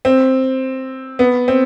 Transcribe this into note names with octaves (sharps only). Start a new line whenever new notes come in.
C4
B3
C4